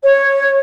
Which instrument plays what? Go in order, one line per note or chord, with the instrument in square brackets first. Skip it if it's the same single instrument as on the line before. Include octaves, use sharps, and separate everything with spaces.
[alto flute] C#5